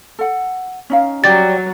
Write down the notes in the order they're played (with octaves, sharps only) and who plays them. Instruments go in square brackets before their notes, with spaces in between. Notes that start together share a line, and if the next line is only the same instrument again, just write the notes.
[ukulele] A4 F#5
C#4 D#4 F5
[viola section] F#3 [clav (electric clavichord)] G3 D5 G5 [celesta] A6